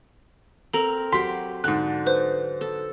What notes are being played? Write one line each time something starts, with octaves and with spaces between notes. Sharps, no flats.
C4 A4 A#4 A#5 F#7
F#3 G4 C6 B6
G#2 D3 F#6
B4 C5
A4